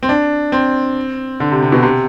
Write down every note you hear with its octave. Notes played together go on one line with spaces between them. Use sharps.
C4
D4
C4
D3
C3
C3
B2
C3